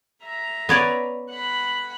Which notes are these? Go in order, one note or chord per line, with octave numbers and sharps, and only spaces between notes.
E5 A#5
B3 C#5 D5
F#5 B5